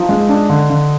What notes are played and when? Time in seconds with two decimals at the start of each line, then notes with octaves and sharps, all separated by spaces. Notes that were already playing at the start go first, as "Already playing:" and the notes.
Already playing: F3 D#4
0.09 G#3
0.29 D4
0.49 D3
0.70 D3